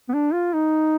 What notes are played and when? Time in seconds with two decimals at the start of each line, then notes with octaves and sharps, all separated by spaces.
0.09 B3
0.14 D4
0.33 F4
0.53 D#4